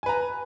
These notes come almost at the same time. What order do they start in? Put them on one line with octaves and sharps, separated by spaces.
G#5 B4 A#5